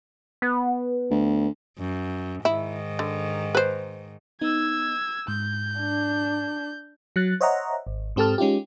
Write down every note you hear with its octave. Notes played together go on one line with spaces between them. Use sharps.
B3
D2
F#2
G#2 D#3 E4
D3
B4 C5
B3 D#4 E6 G#6
G#2 G6
D4
F#3 F#6 A6
C5 C#5 D#5 E5 F#5 A#5
G#1
G#2 C4 G4 A4 A5 F6
G#3 C#4 D#4 F4 G4